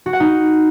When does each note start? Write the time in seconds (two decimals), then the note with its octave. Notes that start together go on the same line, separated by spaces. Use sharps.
0.06 F#4
0.13 F#5
0.20 D#4